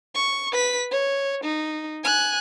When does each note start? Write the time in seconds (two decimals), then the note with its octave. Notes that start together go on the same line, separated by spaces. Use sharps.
0.14 C#6
0.52 B4 B6
0.91 C#5
1.44 D#4
2.04 G#5 F#6